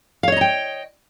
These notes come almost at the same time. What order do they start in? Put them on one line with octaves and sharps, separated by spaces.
F5 C#5 D#5 A#5 G5